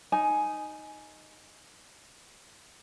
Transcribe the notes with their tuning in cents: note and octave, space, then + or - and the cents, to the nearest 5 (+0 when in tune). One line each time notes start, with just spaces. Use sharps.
D#4 -5 G#5 +10